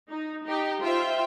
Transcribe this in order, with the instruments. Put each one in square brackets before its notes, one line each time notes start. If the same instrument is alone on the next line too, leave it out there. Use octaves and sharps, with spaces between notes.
[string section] D#4
D#4 G4
F4 C5 E5 G5